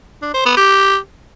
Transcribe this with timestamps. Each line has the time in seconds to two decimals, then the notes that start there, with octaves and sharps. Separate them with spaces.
0.22 D4
0.34 C5
0.45 B3
0.57 G4